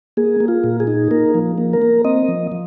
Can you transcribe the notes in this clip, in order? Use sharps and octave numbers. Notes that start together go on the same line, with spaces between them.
A#3 G#4
A#3
F4
A#2
G#4
D#4
A#3 A#4
F3
A#3
A#4
A#3
C4 D#5
F3
F3